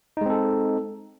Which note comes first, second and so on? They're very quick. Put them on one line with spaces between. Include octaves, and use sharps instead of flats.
D#4 G#3 C4 A4